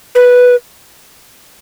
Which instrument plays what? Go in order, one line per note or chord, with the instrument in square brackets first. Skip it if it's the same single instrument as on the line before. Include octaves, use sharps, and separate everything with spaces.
[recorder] B4